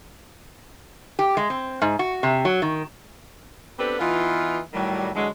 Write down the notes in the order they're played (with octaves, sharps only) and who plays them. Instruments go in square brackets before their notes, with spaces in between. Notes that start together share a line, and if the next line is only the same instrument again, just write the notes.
[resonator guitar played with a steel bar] G4
G#3
C4
G#2
F#4
C3
F#3
D#3
[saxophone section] B3 C4 D4 G4 A4 B4
E3 B3 D#4 F4
A2 D#3 F#3 G3
D3 E3 F#3 G#3